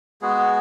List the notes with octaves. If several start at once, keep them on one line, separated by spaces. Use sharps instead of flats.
G#3 B3 F#4 G#4